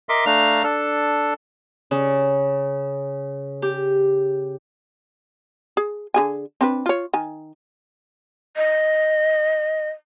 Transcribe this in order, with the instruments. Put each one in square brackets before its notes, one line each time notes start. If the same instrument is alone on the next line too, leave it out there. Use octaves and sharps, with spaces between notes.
[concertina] A#4 D#5 E5 C6 D6
A3 D4 F5 A#5 F6
D4 A4
[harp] C#3
G4
[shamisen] G#4
D3 G#4 G#5
C4 D4 B4
F4 C#5
D#3 G#5
[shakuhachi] D#5